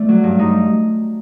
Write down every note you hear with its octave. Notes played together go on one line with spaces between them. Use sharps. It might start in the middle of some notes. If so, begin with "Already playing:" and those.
Already playing: A3 D5
F#3
G2
G2 D#4